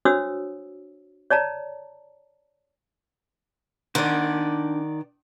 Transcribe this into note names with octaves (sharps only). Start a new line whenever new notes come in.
D4 F#4 C5 C#5 D#6 E6
C#5 D5 A5 A#5
D#3 D4 D5 F#5 G#5 C6